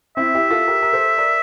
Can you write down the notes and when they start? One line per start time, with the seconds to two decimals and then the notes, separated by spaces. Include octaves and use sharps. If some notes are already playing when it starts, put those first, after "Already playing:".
0.17 C4 E4 E5
0.35 E4 G4
0.50 F4 A4
0.68 G4 A#4
0.82 A#4
0.93 A4 C5
1.18 A#4 D5